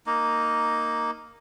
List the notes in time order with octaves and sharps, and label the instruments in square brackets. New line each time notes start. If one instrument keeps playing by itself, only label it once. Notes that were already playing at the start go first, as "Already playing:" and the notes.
[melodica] A#3 D#4